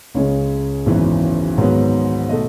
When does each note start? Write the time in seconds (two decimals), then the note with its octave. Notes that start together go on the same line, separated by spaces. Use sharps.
0.14 C#2 C#3 G#3 C#5
0.86 G#1 F#2 E3 B3
1.58 G#2 D#3 F#3 B3
2.29 B2 A3 D#5